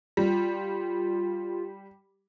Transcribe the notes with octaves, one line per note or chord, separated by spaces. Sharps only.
G3 F4